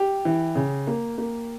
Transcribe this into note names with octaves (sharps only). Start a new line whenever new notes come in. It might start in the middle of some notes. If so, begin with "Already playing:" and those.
Already playing: G4
E3
C#3
A#3
A#3